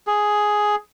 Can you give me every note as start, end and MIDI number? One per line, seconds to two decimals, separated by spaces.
0.07 0.75 68